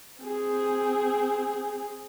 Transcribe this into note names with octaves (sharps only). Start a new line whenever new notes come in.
C4 G#4